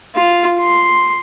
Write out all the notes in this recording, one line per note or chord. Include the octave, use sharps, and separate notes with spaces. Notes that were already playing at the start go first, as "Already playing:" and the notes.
F4
C6